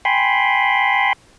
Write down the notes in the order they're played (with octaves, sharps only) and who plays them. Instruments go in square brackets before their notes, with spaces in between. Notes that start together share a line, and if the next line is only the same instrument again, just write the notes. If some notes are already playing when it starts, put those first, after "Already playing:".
[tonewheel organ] G5 G#5 B5 C6